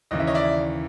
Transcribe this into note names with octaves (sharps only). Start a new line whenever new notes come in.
D#2 C#3 E3 D#5
E5
C#5 D#5
D5 E5